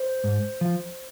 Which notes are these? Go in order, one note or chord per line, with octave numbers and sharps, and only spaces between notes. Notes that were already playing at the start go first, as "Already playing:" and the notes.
Already playing: C5
G#2
F3